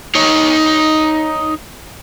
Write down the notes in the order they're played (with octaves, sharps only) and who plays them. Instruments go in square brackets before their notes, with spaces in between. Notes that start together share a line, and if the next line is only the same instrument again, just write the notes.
[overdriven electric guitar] D#4 C#5